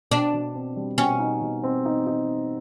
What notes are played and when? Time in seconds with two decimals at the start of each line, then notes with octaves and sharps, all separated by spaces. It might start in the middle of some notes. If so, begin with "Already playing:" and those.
0.11 B2 D4
0.34 B2
0.54 C4
0.76 G3
0.98 B2 C#4
1.20 D#4
1.42 B2
1.64 C4
1.85 D#4
2.07 D#4